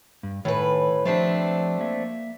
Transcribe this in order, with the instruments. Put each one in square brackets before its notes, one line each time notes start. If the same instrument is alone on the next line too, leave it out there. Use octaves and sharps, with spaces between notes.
[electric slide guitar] G2
[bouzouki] A2 B4 [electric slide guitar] D#3 G#5
[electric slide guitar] F3 G4 [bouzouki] A3 C4 D4
[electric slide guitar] A#3 E5